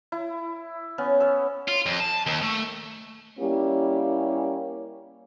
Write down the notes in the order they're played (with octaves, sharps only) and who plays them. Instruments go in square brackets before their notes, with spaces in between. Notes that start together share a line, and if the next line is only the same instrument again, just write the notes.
[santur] E4
B3 C#4
C#5 E6
[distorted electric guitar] F4
F2
A5
D#2
A3
[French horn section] G3 A#3 C#4 E4 G4